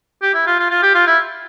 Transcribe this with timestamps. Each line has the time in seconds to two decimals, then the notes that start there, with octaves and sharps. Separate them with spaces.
0.22 G4
0.34 E4
0.47 F4
0.59 F4
0.71 F4
0.82 G4
0.95 F4
1.07 E4